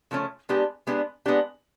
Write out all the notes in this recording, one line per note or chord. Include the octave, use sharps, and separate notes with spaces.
C#3 F3 A3 C#4
G#3 B3 D4 G4
G#3 B3 D4 G4
G#3 B3 D4 G4